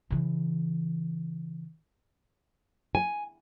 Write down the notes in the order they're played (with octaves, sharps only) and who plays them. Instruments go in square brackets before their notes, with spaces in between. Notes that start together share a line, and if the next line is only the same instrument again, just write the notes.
[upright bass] C#3 E3
[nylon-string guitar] G#5